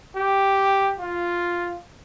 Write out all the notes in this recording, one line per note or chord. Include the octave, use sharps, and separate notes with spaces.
G4
F4